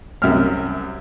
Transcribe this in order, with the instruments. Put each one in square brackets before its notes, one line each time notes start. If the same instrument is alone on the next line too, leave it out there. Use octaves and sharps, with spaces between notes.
[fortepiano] C2 F#2 E5 F6